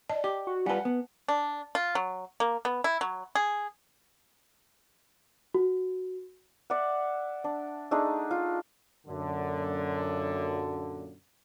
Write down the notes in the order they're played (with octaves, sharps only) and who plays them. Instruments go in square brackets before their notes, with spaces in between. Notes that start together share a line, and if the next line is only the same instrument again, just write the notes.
[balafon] D5 D#5 A5
[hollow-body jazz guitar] G4 [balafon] D6
[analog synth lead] F#4
[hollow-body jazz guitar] G3 F4 B4 [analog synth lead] F#5 [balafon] G#5 A5
[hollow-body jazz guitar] B3
[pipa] D4
F4
F#3
A#3
B3
E4
F#3
G#4
[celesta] F#4
[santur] D5 E5 F#5
D4
A3 D4 D#4 G#4
F4
[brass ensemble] F#2 A#2 D3